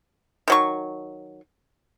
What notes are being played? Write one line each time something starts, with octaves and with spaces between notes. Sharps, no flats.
D#3 F#3 C#6